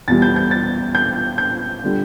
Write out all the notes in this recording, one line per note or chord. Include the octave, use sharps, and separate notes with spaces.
E2 B2 G3 A6
G6
G6
A6
G6
G6
D3 G3